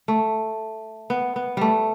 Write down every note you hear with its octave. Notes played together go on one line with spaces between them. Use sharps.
A3
B3
B3
G3 A3